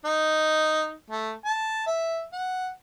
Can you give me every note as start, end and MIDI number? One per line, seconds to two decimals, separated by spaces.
0.05 0.94 63
1.10 1.32 57
1.45 1.85 81
1.87 2.23 76
2.33 2.69 78